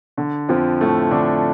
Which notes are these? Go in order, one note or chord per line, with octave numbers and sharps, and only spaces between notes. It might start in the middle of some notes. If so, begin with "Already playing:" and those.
D3
F2 F3
A2 A3
D3 D4